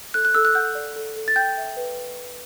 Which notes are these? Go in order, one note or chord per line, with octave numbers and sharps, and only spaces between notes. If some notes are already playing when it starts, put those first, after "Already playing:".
A4 F#6
F#6
A4 E6
F#6
F#5 G6
D5
A4
A4
A6
G5 G6
E5
B4